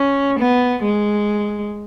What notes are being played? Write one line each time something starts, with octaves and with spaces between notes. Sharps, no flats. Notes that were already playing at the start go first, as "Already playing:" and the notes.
Already playing: C#4
B3
G#3